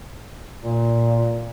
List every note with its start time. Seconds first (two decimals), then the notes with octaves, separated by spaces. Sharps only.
0.62 A#2